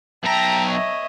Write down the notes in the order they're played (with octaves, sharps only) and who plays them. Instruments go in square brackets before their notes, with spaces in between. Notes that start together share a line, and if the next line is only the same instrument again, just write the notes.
[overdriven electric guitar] B1 A#5 [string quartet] E5 G5 A5
[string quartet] C#5 D#5 E5